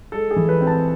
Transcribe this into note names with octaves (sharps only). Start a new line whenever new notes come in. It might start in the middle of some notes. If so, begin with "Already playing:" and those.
G#3 A4
G#4
E3
B4
C4
A5